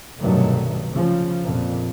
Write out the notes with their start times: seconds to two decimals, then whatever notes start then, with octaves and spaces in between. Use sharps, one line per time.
0.20 F1 B1 G2 D#3 F#3 A3
0.93 C#3 F3
1.42 A#1 F2 A#2